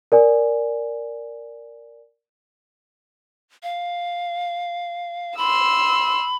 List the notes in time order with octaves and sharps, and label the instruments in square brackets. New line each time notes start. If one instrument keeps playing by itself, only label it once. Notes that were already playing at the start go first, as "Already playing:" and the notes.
[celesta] A#4 D5 G#5
[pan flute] F5
[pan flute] B5 [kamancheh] C6 E6